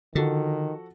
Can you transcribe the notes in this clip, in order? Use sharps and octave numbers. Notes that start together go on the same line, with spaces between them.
D3 D#3 F3 F#4 A4